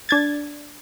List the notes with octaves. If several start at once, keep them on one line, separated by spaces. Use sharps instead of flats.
D4 G#6 A6